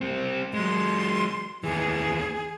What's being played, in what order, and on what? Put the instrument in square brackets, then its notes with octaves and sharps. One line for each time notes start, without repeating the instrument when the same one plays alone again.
[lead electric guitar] G3 C4
[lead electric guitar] F#3 G#3 [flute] C6
[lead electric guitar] D#2 E3 [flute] G#4